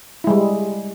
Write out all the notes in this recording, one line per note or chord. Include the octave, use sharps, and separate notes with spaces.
G3 G#3 E4